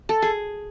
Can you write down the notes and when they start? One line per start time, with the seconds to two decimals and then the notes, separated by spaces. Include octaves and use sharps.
0.09 A4
0.22 G#4